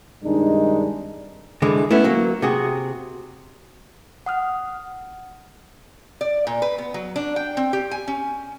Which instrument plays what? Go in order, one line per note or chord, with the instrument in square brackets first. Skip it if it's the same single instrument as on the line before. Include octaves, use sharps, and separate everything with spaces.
[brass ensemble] G2 C3 D#3 G#3 D4 D#4
[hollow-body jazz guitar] C2 D3 E3 G#3
A3 B3 C#4 E4
F#3 A#3
C3 F#4 G#4
[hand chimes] F#5 D#6 F6
[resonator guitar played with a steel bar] D5
A#2
B4
B3
F#3
D4
G5
C4
G4
G#5
C#4